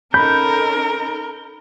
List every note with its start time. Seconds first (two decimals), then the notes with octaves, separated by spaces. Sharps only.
0.14 C#4 D#4 A4 A#4 B5 G6